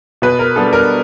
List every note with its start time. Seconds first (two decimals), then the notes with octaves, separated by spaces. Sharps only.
0.22 B2 B4
0.39 A#4
0.56 G3 B3 D4 A4
0.73 A#4